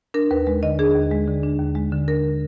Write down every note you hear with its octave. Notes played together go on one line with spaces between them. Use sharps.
D4 A#4
D#2 B4
G#3
D3 D#5
D4 G#4
D#2
G#3
D3
D4
D#2
G#3
D3
D4 A#4